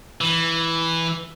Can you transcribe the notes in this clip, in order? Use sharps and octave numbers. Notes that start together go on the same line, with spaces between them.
E3